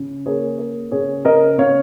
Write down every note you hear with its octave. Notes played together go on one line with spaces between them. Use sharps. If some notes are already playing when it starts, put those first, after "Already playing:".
Already playing: C#3
A#3 G#4 C#5
A#3
C#3 G#4 C#5
C#3 A#4 D#5
C#3 C#5 F5